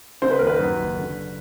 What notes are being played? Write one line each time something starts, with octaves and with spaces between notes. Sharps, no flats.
C#3 C5
B4
D#2 A#4
B4
F#2
F#1
D3